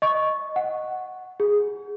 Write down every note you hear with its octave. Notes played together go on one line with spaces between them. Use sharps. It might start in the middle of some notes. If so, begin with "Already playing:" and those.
D#5 C#6
F#5
G#4